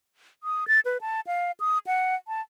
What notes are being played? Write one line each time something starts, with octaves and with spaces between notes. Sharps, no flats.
D#6
A6
B4
A5
F5
D#6
F#5
A5